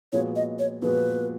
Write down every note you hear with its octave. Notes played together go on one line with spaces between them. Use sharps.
A#2 F3 G#3 B3 F#4 C#5
D#5
C#5
A#2 F3 G#3 B3 F#4 B4